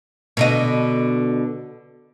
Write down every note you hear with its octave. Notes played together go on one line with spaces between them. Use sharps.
B2 D3 D#5